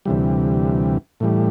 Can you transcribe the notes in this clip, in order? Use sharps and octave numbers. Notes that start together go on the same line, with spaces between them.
D2 C3 E3 G3
A2 E3 G3